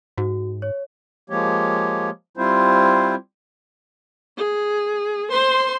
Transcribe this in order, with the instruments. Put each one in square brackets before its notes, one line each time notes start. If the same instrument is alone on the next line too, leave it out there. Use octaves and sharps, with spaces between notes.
[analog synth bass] G#2 [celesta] F#4
[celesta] C#5
[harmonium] F3 G#3 A#3 G4 C#5
G3 C4 E4 F4 C5
[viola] G#4
C5 C6